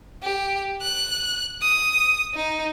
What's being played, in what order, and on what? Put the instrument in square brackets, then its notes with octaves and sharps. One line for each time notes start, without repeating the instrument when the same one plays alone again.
[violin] G4
F#6
D#6
D#4